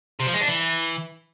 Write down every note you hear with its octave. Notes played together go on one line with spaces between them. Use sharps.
C3
F3
G#3
D4
E3